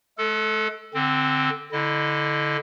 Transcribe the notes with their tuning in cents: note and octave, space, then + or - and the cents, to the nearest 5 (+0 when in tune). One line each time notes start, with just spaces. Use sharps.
G#3 +45 A4 +0
D3 +0 C4 +0
D3 -5 E4 -15 D#5 -25